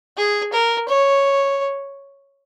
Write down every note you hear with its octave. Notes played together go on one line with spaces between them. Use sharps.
G#4
A#4
C#5